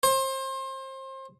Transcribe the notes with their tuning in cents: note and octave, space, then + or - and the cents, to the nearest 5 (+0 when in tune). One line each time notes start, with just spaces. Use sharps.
C5 +30